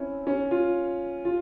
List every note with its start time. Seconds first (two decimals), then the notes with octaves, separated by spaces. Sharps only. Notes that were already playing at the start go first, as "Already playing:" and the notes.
Already playing: C4 C#4 E4
0.27 C#4
0.51 F4
1.25 F4